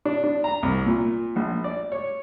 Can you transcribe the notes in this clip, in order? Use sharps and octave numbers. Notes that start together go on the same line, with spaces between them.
D4
D4
A#5
C2
A#2
A#1
D5
C#5